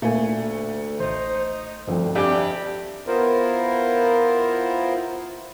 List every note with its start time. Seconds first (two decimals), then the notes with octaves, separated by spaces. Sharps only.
0.02 D2 A#2 A3 A#3 G#5
1.00 A1 D#4 C5
1.87 D2 G2 F3 C4
2.15 F2 D4 G4 E5 F5 G#5
3.07 B3 E4 F4 A#4 C5